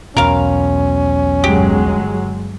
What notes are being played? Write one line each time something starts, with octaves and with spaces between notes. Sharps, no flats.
B1 E2 B2 C#4 A#4 F5
G1 F#3 G#3 G4